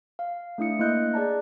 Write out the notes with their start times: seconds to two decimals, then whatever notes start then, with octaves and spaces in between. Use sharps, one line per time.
0.19 F5
0.58 A3 D4 E4 D#6 C#7
0.79 A#3 E4 D#5 F#6 G6
1.14 G#4 D5 A5 A#5